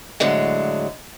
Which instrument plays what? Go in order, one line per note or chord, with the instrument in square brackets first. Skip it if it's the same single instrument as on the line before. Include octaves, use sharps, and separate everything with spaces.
[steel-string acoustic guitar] A2 D3 F#3 G#3